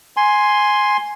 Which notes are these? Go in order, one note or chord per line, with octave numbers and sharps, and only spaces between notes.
G#5 C6